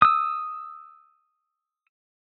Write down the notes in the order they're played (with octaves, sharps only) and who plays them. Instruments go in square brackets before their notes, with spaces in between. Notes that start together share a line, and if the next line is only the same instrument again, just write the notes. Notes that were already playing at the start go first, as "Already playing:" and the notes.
[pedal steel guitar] D#6 E6